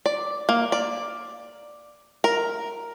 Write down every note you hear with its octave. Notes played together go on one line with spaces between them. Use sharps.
D5
A#3
D5
A#4